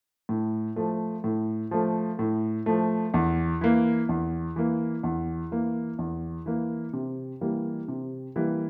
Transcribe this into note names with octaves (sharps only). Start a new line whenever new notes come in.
A2
F3 A3
A2
F3 A3
A2
F3 A3
E2
E3 A#3
E2
E3 A#3
E2
E3 A#3
E2
E3 A#3
C3
E3 G3 A#3
C3
E3 G3 A#3